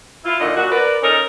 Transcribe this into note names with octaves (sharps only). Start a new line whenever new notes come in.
E4 F4
A#2 D3 D#3 D#5
A#2 F#4
A#4 B4 D5
C#4 D#4 A4 A#4